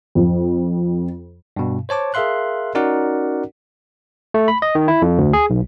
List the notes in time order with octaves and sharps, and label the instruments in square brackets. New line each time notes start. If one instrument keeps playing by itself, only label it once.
[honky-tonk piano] F2
[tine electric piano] G2 B2
C5 C#5 A5 D6
G#4 A#4 E5 F5 C6 F#6
C#4 D#4 F#4 A#4 D5 F#5
A3
B5
D#5
D#3
E4
F2
D2
G#4
B1